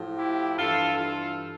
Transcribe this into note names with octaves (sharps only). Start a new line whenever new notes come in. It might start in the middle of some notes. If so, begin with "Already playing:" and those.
Already playing: A2 F3
E4 G4
G2 E3 F4 A4
F4 A4